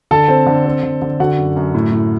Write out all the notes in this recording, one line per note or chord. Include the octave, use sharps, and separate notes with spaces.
D3 A4 A5
C4
D3
C4
D3
D3
D3 F#4 F#5
F#2
F#2
A2
A2